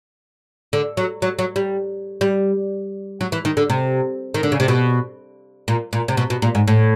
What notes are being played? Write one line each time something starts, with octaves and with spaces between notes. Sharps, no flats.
D3
F#3
F#3
F#3
G3
G3
F#3
E3
D#3
D3
C3
D#3
D3
C#3
C3
B2
A#2
A#2
C3
B2
B2
A#2
G#2
A2